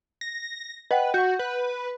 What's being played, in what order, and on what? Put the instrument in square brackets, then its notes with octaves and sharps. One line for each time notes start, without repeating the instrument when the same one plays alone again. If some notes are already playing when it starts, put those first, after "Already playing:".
[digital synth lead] A#6
[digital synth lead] B4 [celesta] D#5 F#5 G5
[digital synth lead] F#4 [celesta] F#5 G6
[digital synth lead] B4